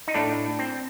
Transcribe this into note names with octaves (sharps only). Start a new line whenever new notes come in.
D#4
A2 A3 D4
C4